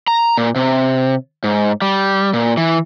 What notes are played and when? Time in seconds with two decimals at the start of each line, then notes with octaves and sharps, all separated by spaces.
0.08 A#5
0.38 A#2
0.56 C3
1.44 G#2
1.82 G3
2.33 A#2
2.57 E3